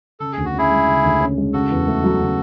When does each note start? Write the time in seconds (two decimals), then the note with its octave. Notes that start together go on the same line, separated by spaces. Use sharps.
0.20 C#3 A4
0.33 D2 G#4
0.45 F#4
0.54 C#4 E4 G#4
0.71 G#3
0.88 C#3
1.04 D2
1.20 C#4
1.38 G#3
1.53 C#3 F#4 A4
1.71 E2
1.87 A3
2.04 F#3
2.21 C#3